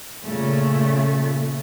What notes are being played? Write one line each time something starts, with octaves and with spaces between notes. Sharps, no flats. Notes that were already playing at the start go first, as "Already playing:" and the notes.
A#2 C#3 A3